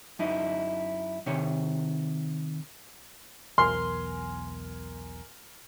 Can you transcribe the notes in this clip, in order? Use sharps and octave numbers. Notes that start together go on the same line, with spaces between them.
F#2 D#4 E4
C3 D#3 C#5
B1 E2 A#4 G#5 C6 F6